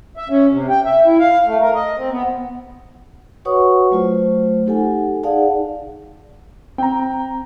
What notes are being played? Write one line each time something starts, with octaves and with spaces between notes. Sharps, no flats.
E5
C#4
C3
G5
E5
E4
F5
A3
A#4
D#5
C4
B3
F#4 B4 C#5 F#5 C#6 D#6
F#3 A3 F4 C5
D#4 G4 A4 F#5 G#5
D#4 G#4 D5 F5 F#5 A5
C4 G5 A#5